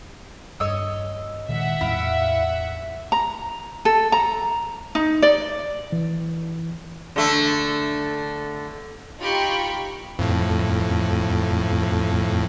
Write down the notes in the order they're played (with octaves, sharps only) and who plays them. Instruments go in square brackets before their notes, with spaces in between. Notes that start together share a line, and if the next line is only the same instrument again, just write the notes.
[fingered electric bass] G2 [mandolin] C#5 D#5 E6
[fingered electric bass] A#2 D#3 G#3 [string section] E5 F#5
[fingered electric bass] E2 A2 G3 [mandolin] E4 F5
[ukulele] A#5
A4
A#5
D#4
D5
[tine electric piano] E3
[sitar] D3 A3
[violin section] D#4 F4 G4 B5 C#6
[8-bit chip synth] F2 A2